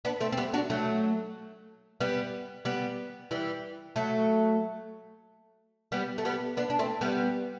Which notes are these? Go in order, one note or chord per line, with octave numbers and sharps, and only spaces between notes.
B3 D4
A3 C4
C4
G3 B3
D4 F#4
F#3 A3
G3 B3
G3 B3
E3 G3
F#3 A3
G3 B3
A3
G3 B3
B3 D4
D4
A3 C4
G3 B3